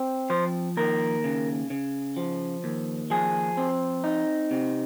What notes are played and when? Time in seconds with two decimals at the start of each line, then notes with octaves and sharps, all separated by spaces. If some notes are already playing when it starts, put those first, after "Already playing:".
Already playing: C4
0.30 F3 C5
0.77 D#2 A#4
1.24 C#3
1.70 C#3
2.17 F3
2.64 D#2
3.10 F3 G#4
3.57 C4
4.04 D#4
4.51 C3